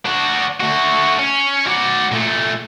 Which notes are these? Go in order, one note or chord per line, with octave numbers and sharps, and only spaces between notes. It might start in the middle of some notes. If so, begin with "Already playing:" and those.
D4 F#4
A3 F#4
C#4
F#4 D5
A#2 A3